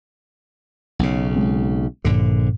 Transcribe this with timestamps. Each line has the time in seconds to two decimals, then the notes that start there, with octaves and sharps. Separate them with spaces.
0.99 B1 C#3
1.36 G#3 C4
2.05 A#1 G2 A#2 D3